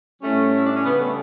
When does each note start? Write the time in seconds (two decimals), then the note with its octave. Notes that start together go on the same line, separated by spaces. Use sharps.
0.21 A2 G3 A3 C#4
0.56 E4
0.65 D4
0.75 C#4
0.84 C#3 G3 B3
1.00 A3